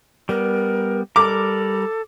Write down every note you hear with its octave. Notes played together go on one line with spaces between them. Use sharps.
G3 B3 A#4
G3 A4 A#4 D6